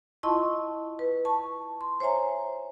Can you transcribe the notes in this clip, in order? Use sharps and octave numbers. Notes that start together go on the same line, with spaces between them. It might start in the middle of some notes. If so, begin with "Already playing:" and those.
E4 F4 D#5 A5 C6 C#6
B4
A5 C#6
C6
C5 C#5 E5 G#5 A#5